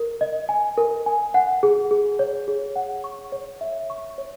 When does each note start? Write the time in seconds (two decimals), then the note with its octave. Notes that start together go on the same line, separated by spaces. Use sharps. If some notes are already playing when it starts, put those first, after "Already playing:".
Already playing: A#4
0.21 D#5
0.49 G#5
0.77 A#4
1.06 G#5
1.34 F#5
1.63 G#4
1.91 G#4
2.19 C#5
2.48 G#4
2.76 F#5
3.04 C#6
3.32 C#5
3.61 E5
3.90 C#6
4.18 C#5